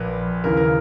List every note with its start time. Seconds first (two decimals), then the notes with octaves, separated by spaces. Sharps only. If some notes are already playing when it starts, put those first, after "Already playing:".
Already playing: A#1 A#2 A#4 B4
0.44 D#2 C#3 E3 A#4
0.57 A#4